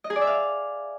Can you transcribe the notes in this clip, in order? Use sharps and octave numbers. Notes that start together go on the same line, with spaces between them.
D#5
G#4
D5
E5
F5